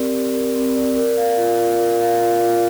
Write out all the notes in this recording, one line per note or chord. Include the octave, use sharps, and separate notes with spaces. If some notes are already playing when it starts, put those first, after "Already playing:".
Already playing: C4 G4 A#4 D5
G4
A#4
C4
D5
A#4
F5
F4
F4
A#4
F5
F4
F4